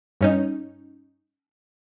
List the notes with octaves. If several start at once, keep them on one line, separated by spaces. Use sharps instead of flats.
G2 C#4 D#4